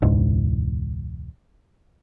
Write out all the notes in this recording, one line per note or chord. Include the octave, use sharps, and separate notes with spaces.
E1 C#2 G#2